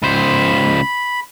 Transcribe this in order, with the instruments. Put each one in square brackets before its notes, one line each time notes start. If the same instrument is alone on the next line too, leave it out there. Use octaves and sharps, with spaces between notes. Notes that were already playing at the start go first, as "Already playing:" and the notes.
[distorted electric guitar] C#2 C5 [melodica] B5